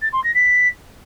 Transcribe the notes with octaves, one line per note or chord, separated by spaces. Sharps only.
A6
C6
A#6
B6